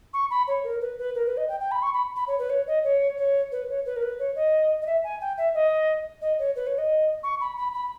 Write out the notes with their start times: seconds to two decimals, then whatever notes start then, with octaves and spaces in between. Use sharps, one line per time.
0.13 C#6
0.30 B5
0.47 C#5
0.64 A#4
0.81 B4
0.98 B4
1.15 A#4
1.26 B4
1.37 D#5
1.48 G5
1.60 G5
1.71 B5
1.82 C#6
1.93 B5
2.16 B5
2.27 C#5
2.38 B4
2.49 C#5
2.67 D#5
2.84 C#5
3.17 C#5
3.51 B4
3.68 C#5
3.85 B4
3.96 A#4
4.02 B4
4.19 C#5
4.35 D#5
4.81 D#5
4.86 E5
5.03 G#5
5.20 G5
5.37 E5
5.54 D#5
6.21 D#5
6.38 C#5
6.55 B4
6.66 C#5
6.78 D#5
7.23 C#6
7.40 B5
7.56 B5
7.74 B5